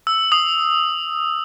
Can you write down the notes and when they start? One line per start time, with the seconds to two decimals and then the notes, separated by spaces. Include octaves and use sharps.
0.07 E6
0.32 D#6